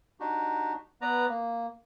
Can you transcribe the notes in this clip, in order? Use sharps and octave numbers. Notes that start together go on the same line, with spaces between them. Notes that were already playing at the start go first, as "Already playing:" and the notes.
D4 D#4 F#4 G4
B3 B4 D5 A#5
A#3